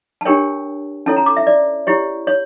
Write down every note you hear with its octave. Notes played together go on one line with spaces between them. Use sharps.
A5
D4 G4 A#4 C#5 G5
C#4 E4 A4 C#5 A5
A#5
D6
E5
D5
E4 G4 C#5
C#5